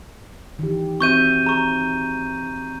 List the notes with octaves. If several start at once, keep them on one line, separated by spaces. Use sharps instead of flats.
D#3 E3 G4
C4 F#4 E5 C#6 G6 D#7
G#4 A#5 C#6